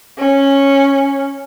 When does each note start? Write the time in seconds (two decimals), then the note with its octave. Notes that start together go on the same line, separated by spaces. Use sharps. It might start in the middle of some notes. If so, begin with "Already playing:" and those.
0.18 C#4